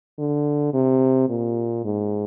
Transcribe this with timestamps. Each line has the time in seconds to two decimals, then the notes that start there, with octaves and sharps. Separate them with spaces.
0.19 D3
0.74 C3
1.29 A#2
1.85 G#2